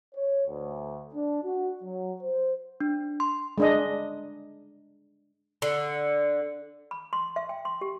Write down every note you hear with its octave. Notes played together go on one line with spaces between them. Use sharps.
C#5
D2
D4
F#4
F#3
C5
D4
C6
G#3 D4 D#5
D3
B5
C6
E5
G5
C6
G4